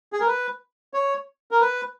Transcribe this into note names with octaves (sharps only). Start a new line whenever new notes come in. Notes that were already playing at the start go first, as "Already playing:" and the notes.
G#4
A#4
B4
C#5
A#4
B4